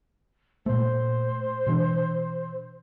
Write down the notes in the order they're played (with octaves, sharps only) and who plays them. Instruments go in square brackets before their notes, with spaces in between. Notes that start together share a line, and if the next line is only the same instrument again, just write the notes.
[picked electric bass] A#2 A3 [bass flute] C5
[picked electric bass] B2 E3 D4